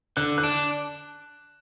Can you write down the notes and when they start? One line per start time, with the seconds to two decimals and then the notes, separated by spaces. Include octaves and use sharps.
0.17 D3 F#6
0.38 F#6
0.44 D4